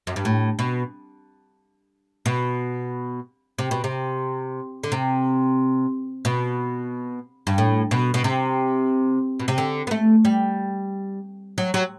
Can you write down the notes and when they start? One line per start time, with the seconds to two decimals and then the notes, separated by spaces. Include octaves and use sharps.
0.07 F#2
0.16 G2
0.25 A2
0.59 B2
2.26 B2
3.58 C3
3.71 B2
3.84 C3
4.84 D3
4.92 C3
6.25 B2
7.47 G2
7.58 A2
7.91 B2
8.14 B2
8.24 C3
9.40 B2
9.48 C3
9.58 D3
9.87 B3
9.91 A3
10.25 G3
11.58 F#3
11.74 F#3